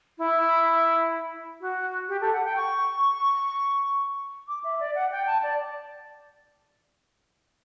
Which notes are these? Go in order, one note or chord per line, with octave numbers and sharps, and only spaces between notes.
E4
F#4
G4
A4
F#5
G5
C#6
D6
E5
D5
F#5
G5
A5
D5